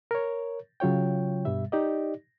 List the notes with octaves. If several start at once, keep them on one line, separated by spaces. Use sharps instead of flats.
A#4 C#5
C#3 F#3 F4 C#5 G5
G2 B2 G3 E5
D#4 G4 D5 D#5